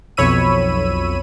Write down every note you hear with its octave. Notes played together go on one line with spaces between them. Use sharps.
B1 F2 C#5 B5 E6 D#7